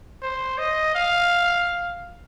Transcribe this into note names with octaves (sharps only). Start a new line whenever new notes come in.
C5
D#5
F5